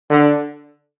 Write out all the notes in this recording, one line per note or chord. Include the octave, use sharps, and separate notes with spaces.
D3